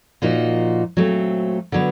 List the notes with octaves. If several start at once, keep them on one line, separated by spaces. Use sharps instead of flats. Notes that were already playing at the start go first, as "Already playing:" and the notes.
A#2 F3 A#3 D#4 F#4
A#2 F#3 A3 C4
D3 F#3 B3